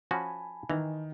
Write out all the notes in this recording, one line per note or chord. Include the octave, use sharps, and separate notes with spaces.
F3 C#4 F#4 G#5 A5 B5
D#3 E3 A#5